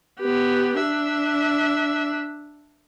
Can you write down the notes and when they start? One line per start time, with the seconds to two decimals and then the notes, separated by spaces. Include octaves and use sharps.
0.20 B3 G4
0.79 D4 E5